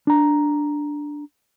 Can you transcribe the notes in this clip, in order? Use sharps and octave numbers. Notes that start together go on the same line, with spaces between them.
D4 A#5